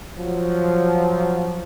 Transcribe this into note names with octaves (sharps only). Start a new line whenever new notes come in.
F3 F#3